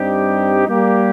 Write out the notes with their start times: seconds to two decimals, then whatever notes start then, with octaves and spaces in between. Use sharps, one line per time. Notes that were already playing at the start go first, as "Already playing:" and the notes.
Already playing: G2 G3 C4 D#4 G4
0.66 G3 A#3 G4